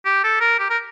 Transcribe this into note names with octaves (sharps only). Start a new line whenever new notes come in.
G4
A4
A#4
G4
A#4